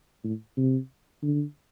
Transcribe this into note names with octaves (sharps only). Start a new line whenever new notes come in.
A2
C3
D3